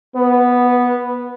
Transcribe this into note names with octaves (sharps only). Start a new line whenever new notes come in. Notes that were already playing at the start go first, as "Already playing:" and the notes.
B3 B4